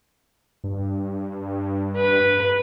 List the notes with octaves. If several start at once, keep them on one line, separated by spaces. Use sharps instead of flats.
G2
B4